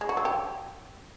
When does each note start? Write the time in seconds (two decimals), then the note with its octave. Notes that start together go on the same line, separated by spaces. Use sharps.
0.01 G#3
0.09 F#4
0.17 F#3
0.25 G4